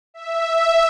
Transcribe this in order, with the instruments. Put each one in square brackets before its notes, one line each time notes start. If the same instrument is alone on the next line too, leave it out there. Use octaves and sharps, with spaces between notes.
[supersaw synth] E5